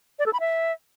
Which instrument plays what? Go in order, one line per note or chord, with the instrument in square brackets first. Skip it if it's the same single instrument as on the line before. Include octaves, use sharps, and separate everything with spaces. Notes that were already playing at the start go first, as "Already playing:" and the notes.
[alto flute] D5
A4
B5
E5